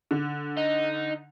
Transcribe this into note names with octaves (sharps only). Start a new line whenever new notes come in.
D3
D#4 D#5